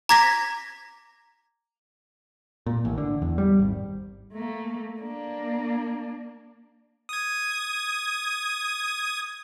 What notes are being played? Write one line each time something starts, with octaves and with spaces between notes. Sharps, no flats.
A#5 D6 G#6 A#6 B6
A#2
A1
D3
E2
G3
G#1
A3 A#3
A#3 D4
D#6 G#6